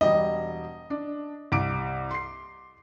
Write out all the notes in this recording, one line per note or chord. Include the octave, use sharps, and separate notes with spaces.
E1 G3 D#5
D4
C2 D6 D7
C6 C7